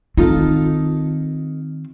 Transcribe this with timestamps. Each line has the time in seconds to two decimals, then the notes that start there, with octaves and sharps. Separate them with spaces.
0.17 D#3 C4 D#4 F4 A4